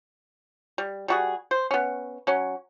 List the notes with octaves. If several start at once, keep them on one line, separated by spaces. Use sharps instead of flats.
G3
G3 F#4 G#4
C5
B3 C#4
F#3 C#4